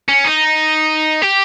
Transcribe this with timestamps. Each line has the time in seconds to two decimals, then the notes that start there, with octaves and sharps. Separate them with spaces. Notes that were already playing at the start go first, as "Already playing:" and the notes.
0.09 C#4
0.24 D#4
1.22 G4